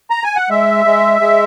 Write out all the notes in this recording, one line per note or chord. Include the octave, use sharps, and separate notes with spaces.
A#5
G#5
F#5
G#3 E5
G#3
G#3